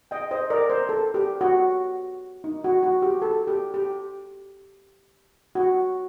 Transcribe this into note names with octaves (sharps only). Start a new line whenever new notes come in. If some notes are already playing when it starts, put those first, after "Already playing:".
D#5 G5
C5 D#5
A#4 D5
C5
A4
G4
F#4
D#4
F#4
F#4
G4
A4
G4
G4
F#4